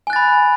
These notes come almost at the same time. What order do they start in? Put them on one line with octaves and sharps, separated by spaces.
G#5 F#6 A6 B5